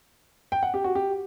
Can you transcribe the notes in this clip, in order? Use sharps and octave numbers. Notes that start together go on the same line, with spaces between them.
G5
F#5
G4
F#4
G4